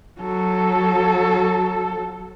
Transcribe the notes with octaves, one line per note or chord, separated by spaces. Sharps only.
F#3 A4